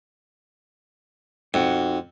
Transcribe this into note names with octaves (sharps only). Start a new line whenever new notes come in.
F2 D#4 F#4 F#5